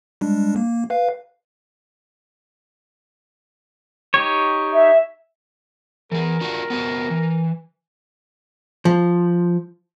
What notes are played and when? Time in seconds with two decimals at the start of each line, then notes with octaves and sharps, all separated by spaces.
0.21 G3 G#3 D4
0.56 A#3
0.90 B4 F5
4.14 D#4 G4 C#5
4.73 E5
6.12 E3 G#4 A#4
6.41 D4 F4 F#4
6.70 B3 C4 F#4
7.10 E3
8.85 F3